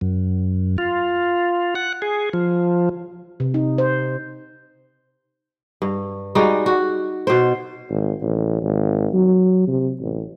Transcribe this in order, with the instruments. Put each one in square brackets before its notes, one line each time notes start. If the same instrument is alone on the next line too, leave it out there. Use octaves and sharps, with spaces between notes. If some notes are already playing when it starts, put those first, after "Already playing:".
[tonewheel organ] F#2
F4
F#5
G#4
F3
[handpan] C3
D#4
C5
[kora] G2
G3 G#3 D#4 F#4
F#4
B2 C5
[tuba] G#1
A1
G#1
F#3
C3
A1